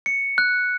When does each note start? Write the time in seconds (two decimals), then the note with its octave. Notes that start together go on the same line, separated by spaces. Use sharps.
0.06 C#7
0.38 F#6